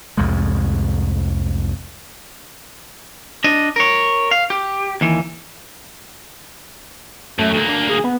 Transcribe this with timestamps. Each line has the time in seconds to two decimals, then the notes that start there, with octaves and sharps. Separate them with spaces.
0.17 C2 F2 A2 G#3
3.44 D4 D#5
3.76 A#4 C#5
4.31 F5
4.50 G4
5.01 D#2 E3
7.39 F#2 A3
7.54 D2 A#3
7.68 D4
7.89 G#4
8.04 B3